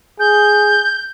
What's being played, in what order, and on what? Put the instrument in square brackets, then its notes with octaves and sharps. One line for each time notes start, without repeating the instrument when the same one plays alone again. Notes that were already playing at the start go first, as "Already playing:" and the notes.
[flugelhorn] G#4 [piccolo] G6